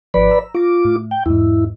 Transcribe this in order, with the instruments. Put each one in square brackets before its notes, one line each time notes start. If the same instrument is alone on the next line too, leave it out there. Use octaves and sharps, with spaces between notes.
[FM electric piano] G#1 F3 [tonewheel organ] B4 D5 B5
[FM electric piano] A#5 E6
[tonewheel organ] F4 D6 [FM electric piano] C#6 A#6
[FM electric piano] A2
[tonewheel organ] G5
[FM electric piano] E2 G#2 [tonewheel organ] E4